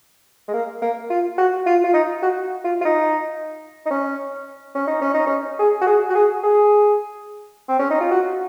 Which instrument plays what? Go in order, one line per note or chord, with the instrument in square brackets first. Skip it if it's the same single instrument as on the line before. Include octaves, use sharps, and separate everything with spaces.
[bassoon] G#3
A#3
A#3
F4
F#4
F4
F4
D#4
F#4
F4
F4
D#4
D#4
C#4
C#4
D#4
C#4
D#4
C#4
G#4
F#4
G#4
F#4
G#4
G#4
C4
C#4
D#4
F4
F#4